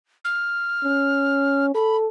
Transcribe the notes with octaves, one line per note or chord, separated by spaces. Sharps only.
F6
C#4
A4 B5